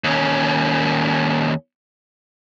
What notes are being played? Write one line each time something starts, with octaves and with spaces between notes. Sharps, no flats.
D#2 C#4